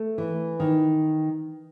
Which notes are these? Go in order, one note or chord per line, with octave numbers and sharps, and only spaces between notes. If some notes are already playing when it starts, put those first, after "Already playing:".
Already playing: A3
E3
D#3